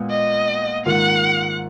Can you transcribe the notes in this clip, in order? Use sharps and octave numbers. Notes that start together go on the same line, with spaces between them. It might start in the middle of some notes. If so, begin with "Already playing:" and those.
Already playing: A#2 G#3 B3
D#5
G#2 D#3 A#3 F4 F#5